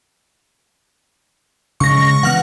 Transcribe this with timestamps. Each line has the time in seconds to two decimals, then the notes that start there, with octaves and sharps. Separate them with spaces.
1.80 C#3 G#3 C#6 A#6
2.23 E3 B3 F#5 F6